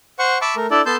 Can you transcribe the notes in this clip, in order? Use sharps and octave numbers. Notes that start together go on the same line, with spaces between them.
C5 F#5 C#6
E5 A5 B5 C#6 D6
A3 A#4
D4 E4 A4 D5
B3 A4 A5 C6 G6